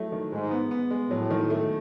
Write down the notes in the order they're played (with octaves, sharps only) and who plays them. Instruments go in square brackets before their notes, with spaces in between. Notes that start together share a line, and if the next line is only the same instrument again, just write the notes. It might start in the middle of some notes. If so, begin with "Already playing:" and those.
Already playing: [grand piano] F#3 A3 E4
D#3
[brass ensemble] G#2 [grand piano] G#3
[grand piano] B3
B3
G#3
[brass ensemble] A2 [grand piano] F#3
[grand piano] D#3
A3